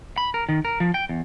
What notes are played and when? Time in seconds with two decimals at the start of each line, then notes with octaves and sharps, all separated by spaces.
0.18 B5
0.34 A#4
0.49 D#3
0.65 A#4
0.80 F3
0.94 G5
1.09 E2